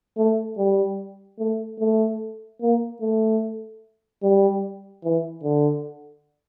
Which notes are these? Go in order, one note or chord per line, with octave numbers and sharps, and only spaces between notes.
A3
G3
A3
A3
A#3
A3
G3
E3
D3